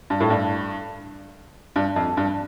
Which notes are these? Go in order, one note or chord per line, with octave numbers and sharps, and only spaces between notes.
G2
A2
G2
G2
F2
G2